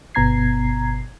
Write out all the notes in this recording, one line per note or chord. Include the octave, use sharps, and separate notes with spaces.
G1 B2 B3 A#5 G#6 C7